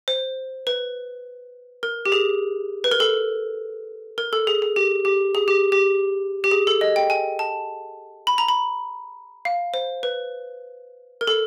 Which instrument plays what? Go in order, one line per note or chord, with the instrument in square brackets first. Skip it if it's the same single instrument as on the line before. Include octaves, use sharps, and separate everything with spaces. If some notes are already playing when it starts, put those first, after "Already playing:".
[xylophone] C5
B4
A#4
G4
G#4
B4
A#4
A4
A#4
A4
G#4
G#4
G4
G4
G#4
G4
G4
G4
G#4
A4
D#5
G5
G#5
A5
B5
A#5
B5
F5
C5
B4
A#4
A4